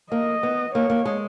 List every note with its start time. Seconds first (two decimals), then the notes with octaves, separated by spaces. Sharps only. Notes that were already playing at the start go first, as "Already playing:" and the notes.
0.12 A#3 D#5
0.43 B3
0.74 A#3 C#5
0.90 A#3
1.05 G#3